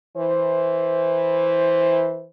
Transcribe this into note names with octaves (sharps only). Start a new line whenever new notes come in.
E3 C5